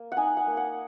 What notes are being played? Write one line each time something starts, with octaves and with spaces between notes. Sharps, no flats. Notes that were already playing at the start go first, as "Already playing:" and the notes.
Already playing: A#3
F#5
D#4 G#5
F#5
A#3
F#5